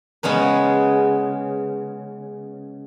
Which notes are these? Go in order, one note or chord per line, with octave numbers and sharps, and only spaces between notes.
C#3 G#3 B3 C#4 B4